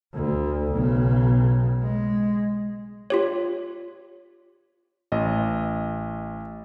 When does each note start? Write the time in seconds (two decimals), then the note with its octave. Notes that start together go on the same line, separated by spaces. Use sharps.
0.14 D2
0.72 B1 C#3
1.80 G#3
3.10 F4 G4 C#5
5.12 A1 D#5